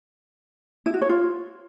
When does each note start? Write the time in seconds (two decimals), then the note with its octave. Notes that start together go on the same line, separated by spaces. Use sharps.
0.86 E4
0.94 F#4
1.02 C#5
1.09 F4